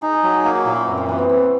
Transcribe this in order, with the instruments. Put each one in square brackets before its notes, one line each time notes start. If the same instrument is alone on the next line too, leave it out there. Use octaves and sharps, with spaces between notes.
[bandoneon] D#4 [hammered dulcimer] G#4
[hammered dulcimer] G#4
[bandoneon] F#3 [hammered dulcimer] G4
[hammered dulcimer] G#4
[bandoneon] A#3 [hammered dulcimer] G4
[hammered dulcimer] F#4
[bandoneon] A#2 [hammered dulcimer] E4
[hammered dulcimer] C#4
[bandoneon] F#2 [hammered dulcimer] C4
[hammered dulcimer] C4
[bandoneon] E3 [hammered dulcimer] B3
[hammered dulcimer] C4
[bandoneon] E3 [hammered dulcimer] C4